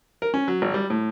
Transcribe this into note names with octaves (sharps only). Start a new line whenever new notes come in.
A#4
C#4
F#3
G#1
G3
A2